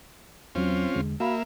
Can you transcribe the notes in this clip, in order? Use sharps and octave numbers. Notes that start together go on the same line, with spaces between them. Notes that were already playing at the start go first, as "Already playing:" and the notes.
E2 F#3 C4 C#4 F4
E2 D3 G#3
A#3 F#4 E5 F5 B5